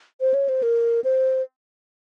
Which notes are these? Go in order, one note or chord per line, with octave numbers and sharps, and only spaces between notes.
C5
C#5
C5
A#4
C5